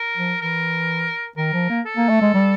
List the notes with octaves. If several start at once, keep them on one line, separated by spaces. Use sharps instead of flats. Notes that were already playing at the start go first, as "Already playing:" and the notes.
Already playing: A#4
F3
E3 A#4
D#3 A#4
F3
A#3
A4
A#3
A3
G#3
G3